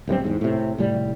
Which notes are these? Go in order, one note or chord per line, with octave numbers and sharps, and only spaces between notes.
D1 G2 G3 C4
E2 G#2
A2 C3
F1 A2 G3